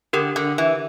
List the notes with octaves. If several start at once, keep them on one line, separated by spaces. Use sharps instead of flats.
D3 D4 G4 A#4
D3
E3